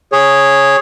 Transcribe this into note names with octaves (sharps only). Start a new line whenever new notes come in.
G#4 C#5